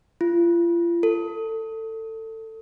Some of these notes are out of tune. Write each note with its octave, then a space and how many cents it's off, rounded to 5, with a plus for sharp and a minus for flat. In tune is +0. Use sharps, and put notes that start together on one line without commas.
F4 -40
A4 +20